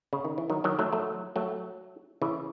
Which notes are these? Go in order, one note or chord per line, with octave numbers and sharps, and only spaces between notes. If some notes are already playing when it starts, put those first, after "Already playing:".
C#3
D#3
E3
D#3 F#3
D#3 F#3
F#3 A3
F#3 A3
F#3 A3
C#3 E3